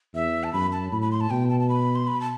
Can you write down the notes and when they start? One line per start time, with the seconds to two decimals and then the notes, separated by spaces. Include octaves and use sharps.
0.14 E2 E5
0.44 A5
0.53 F#2 B5
0.72 A5
0.92 A2 B5
1.02 B5
1.11 C6
1.21 A5
1.30 B2 G5
1.50 A5
1.60 A5
1.69 B5
1.95 C6
2.07 B5
2.20 A5